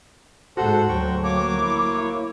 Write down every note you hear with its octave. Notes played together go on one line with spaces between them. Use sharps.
G#2 F#4 A4 C5 F#5
D2 F#3 G5 C#6
A#3 C#5 D6
E4